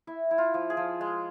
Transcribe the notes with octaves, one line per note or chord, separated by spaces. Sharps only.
E4 E5
E4
F4
F3
G#4
F3
G#3